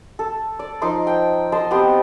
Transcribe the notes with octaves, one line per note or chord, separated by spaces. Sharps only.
A4
D5
F3 D#4 C6 D6
G5
D#5 A5 C6
B3 C4 G4 C6